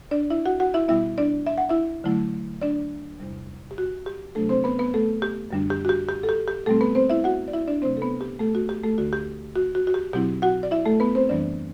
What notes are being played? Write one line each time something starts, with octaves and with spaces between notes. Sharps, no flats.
D4 D5
E4 E5
F#4 F#5
F#4 F#5
E4 E5
B2 G3 B3 E4 E5
D4 D5
E5
F#5
E4 E5
D3 F#3 A3 E4
D4 D5
E2 C3 G3
G4
F#4
G4
C3 F#3 A3 D4 A4
C4 C5
B3 B4
B3 B4
A3 A4
G4
F#2 D3 G3 D4
G4
F#4
G4
G4
A4
G4
G4
B2 G3 A3 C4 A4
B3 B4
C4 C5
E4 E5
F#4 F#5
D5
E4 E5
D4 D5
C3 F#3 A3 C4 C5
A4
B3 B4
G4
A3 A4
F#4
G4
A3 A4
D2 D3 A3 F#4
G4
F#4
F#4
F#4
G4
B2 F#3 C4 E4 G4
F#4 F#5
D5
E4 E5
A3 A4
B3 B4
C4 C5
F#2 E3 G3 B3 D4 D5